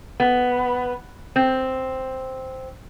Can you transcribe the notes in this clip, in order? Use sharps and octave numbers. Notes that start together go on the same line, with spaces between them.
B3
C4